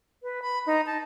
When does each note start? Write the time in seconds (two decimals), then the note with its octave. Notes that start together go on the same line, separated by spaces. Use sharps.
0.23 B4
0.42 B5
0.66 D#4
0.86 A5